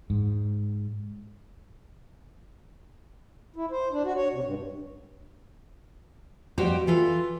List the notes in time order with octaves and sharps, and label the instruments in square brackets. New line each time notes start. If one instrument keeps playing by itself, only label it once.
[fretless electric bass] G#2
[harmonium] E4
C5
D4
F#4
C#5
C3
G2
[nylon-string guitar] F2 G3 F#4 G4 C5 G5
E3 F4 A4